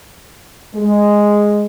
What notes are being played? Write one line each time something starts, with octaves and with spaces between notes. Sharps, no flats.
G#3